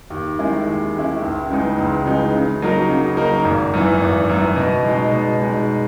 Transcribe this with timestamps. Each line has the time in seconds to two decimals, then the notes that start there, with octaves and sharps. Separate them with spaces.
0.10 D#2
0.39 D#3 G#3 C#4 E4
0.67 D#2
0.95 D#3 G#3 C#4 E4
1.22 C#2
1.50 C#3 E3 G#3 D#4
1.78 C#2
2.05 C#3 E3 G#3 D#4
2.34 C#3
2.62 F#3 A#3 D#4 A#4
2.89 C#3
3.17 F#3 A#3 D#4 A#4
3.45 G#1
3.74 F#2 E3
4.02 G#1
4.29 F#2 E3
4.56 B2
4.85 G#3 D#4
5.12 B2
5.40 G#3 D#4